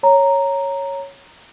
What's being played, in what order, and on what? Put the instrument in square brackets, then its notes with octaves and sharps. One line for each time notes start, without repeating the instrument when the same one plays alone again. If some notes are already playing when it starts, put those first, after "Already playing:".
[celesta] C#5 A#5